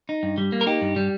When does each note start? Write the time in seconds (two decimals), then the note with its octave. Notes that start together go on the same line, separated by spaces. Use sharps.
0.09 D#4
0.23 G2
0.38 G3
0.52 A#3
0.61 A#4
0.67 D#4 G4
0.82 G2
0.96 G3